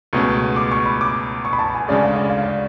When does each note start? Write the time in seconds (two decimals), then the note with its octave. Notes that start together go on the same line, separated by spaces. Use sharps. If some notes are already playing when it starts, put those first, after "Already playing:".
0.13 C#2 B2 A3 C#4 C#6
0.56 D6
0.72 C#6
0.86 B5
1.01 D6
1.45 C#6
1.53 B5
1.59 A5
1.75 G#5
1.88 D2 C#3 G#3 C#4 G#4 D5
2.03 F5
2.16 D5
2.29 F5
2.43 D5